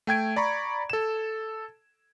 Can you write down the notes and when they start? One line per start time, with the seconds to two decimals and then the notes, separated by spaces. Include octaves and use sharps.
0.07 A3 G5 G#6 D7
0.36 D5 A#5 B5 C#6
0.90 A4 E7